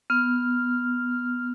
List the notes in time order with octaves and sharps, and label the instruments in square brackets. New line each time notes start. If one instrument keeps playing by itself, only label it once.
[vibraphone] B3 [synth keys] F6